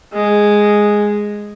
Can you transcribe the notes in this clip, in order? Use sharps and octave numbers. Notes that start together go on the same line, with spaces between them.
G#3